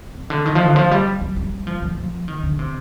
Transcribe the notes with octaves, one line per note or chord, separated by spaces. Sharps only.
C3
D3
D#3
F3
D3
F3
G3
G3
G3
F3
F3
F3
D#3
D3
C3